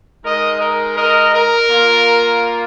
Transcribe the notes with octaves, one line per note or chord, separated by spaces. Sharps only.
G#3 D#4 A#4 D#5
A#4
A#4 D#5
A#4
A#3 F4